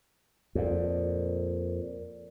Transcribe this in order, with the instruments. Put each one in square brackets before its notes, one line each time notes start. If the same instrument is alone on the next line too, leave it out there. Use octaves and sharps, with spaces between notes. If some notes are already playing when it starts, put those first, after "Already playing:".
[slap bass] F2 A#2